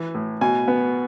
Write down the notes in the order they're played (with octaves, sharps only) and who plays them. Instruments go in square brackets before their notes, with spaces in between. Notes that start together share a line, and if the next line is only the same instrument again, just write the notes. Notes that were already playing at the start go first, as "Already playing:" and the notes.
Already playing: [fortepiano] E3
A2
B2 G#5
B3